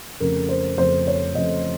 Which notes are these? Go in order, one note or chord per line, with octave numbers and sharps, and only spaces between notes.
F2 C#3 A3 A#4
C5
F2 C#3 A3 C5
C#5
F2 C#3 A3 D#5